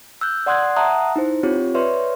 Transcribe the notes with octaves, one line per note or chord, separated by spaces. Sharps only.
E6 F#6 G6
D5 F#5 C6 D#6 F#6 G#6
E5 F#5 A5 A#5 D#6 F#6
D#4 E4 C5
C4 F4 G4 C#5
B4 C#5 D5 E5 C6 C#6